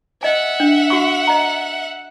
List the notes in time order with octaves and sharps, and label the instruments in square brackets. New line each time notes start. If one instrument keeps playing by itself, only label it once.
[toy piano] D#5 G#5 [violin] E5 F#5
[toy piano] D4
F#4 C#6
D#5 A#5